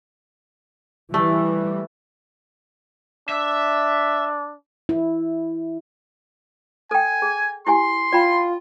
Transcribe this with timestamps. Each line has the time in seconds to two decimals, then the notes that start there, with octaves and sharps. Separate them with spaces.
1.14 E3 G3 A3
3.29 D4 E5
4.89 E4
6.91 A4 G5 G#5
7.22 G#4
7.67 E4 G4 G#5 C6
8.12 F4 D5 G5 B5